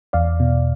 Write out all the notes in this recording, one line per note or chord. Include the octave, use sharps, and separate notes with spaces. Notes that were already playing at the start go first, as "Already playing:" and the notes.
E2 D5 F5
B2